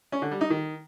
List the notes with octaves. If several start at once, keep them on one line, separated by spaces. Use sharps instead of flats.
C#4
D3
G3
D#4
D#3